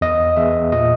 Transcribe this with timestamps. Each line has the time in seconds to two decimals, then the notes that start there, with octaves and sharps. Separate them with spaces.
0.01 E2 D#5
0.37 E2 E5
0.72 A#2 D#5